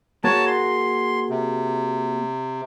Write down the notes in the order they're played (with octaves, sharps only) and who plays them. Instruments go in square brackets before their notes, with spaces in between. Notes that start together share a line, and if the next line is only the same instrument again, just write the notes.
[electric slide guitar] A#3 F#4 G#4 [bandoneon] C#5 A5
[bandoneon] C6
C3